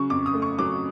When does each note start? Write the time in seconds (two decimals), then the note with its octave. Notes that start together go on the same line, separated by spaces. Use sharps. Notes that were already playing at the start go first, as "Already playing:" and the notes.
Already playing: C#3 F#3 C#6
0.10 F2 D6
0.26 D#6
0.34 A3
0.42 C#6
0.59 F#3 D6